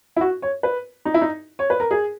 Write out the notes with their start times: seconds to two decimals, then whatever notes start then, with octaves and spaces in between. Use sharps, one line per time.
0.16 E4
0.21 F#4
0.42 C#5
0.63 B4
1.05 D#4
1.14 E4
1.21 D#4
1.59 C#5
1.70 B4
1.80 A#4
1.91 G#4